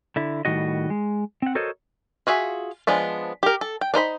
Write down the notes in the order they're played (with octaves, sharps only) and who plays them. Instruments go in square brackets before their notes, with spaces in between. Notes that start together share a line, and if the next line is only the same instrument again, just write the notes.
[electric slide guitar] D3 E4
A2 D#3 G3 F#4 D#5
G#3
C4 F#5
F#4 A4 A#4 C5 C#5 D#5
[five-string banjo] F4 F#4 G#4 E5
F3 G#3 B3 D4
G4 A#4
A4
G5
D4 D#4 C5 B5